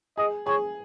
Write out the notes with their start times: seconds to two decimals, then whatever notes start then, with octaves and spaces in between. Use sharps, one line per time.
0.17 G#4 D#5
0.46 G#4 C#5